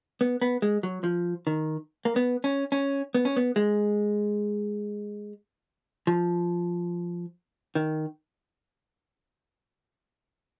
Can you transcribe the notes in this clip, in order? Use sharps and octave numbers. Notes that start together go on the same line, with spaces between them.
B3
B3
G#3
F#3
F3
D#3
A#3
B3
C#4
C#4
B3
C#4
B3
G#3
F3
D#3